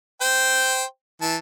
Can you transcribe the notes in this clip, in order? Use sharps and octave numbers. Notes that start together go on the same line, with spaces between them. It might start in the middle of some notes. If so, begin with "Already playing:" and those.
C5 G5
E3 A5